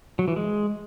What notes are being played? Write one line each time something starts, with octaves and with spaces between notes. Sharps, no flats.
F#3
E3
G#3